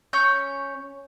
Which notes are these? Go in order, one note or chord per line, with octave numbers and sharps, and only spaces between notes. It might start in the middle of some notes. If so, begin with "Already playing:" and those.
C#4 C#5 G6